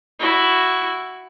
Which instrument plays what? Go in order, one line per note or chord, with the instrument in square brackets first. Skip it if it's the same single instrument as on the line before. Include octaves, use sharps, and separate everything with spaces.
[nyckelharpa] E4 F#4